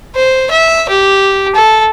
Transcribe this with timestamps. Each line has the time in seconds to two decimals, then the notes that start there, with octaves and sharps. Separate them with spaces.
0.16 C5
0.51 E5
0.89 G4
1.55 A4